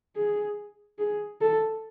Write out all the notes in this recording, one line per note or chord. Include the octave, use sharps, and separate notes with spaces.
G#4
G#4
A4